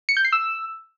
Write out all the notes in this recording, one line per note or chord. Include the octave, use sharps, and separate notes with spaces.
C#7
G6
C7
E6